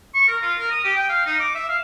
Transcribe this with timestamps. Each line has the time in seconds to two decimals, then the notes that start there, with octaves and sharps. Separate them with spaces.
0.14 C#6
0.27 A#4
0.42 F4
0.59 A#4
0.71 D#6
0.84 G4
0.96 G5
1.09 F5
1.26 D#4
1.40 D6
1.55 E5
1.68 F5